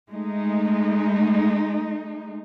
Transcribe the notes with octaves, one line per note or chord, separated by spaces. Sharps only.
G#3 A3 D#4